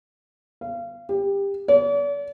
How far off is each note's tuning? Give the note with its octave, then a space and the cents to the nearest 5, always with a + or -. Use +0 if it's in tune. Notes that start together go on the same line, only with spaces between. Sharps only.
F5 -30
G4 +20
D5 -45